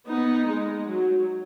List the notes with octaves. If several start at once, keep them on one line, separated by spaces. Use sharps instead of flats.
B3 D#4
G#3
F#3